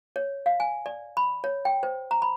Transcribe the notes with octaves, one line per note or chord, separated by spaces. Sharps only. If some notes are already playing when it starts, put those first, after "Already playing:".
C#5
F5
G#5
D5
B5
C#5
G5
C5
A#5
B5